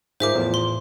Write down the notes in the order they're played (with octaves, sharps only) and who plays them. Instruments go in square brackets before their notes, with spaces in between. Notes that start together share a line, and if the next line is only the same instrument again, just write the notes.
[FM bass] G#2 [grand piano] F4 G#4 A#4 [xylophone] C5 E5 D6
[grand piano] E2 F3 F4 [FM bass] A2
[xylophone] C6